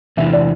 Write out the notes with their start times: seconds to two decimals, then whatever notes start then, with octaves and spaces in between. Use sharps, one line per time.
0.17 E2 C3 E3 E5
0.33 D5